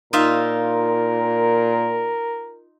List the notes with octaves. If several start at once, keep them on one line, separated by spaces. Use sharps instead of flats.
A#2 D#4 F4 A#4 E5